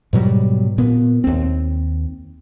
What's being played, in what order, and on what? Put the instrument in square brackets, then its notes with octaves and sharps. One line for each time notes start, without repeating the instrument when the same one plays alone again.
[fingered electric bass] G#2 B2 F#3 G3
A#2 B3
D#2 C4